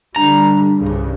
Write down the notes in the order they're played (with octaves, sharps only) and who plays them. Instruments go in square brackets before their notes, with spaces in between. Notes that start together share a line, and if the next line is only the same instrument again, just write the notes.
[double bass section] D3 G3 [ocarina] D4 [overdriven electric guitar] A#5
[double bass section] C2 G2 C#3